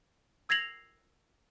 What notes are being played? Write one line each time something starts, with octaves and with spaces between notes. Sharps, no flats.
E6 G#6 A#6 C7 F7 F#7